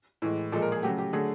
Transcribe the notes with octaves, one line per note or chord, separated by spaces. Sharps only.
A2 E3 G#3
A#2 F3 G#3 A4
A#4
G#4
C#3 F#3 A3 G4
G4
D3 F#3 A3 G#4